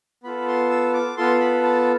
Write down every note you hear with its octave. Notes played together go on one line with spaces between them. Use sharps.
B3 F4 A4 B5
C6
E6
D6
B3 F4 A4 C6
B5
A5